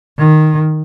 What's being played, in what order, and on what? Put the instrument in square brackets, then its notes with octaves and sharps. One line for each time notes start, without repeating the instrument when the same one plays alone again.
[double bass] D#3